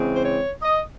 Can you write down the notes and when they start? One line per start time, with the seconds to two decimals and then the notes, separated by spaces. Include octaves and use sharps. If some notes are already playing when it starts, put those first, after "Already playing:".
Already playing: C#3 E3 G#3 C4
0.13 C5
0.24 C#5
0.62 D#5